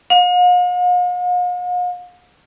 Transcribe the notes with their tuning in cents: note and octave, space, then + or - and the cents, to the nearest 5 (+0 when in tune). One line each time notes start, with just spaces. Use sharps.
F5 +45